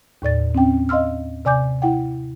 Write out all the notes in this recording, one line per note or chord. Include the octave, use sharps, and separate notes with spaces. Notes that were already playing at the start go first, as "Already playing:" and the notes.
D#2 A2 D5 A6
C4 C#4 G5
D#5 F5 C6 E6 F6
C3 D5 G#5 D6 G6
E4 F#5 G5